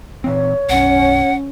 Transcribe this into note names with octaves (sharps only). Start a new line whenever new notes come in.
A#2 E3 C4 C#5
B1 F#2 C#4 F#5